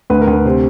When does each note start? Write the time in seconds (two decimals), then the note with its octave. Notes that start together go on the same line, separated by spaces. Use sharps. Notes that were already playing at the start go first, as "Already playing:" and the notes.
0.10 D2 B4
0.21 A#4
0.27 D2
0.33 B4
0.45 C3 C5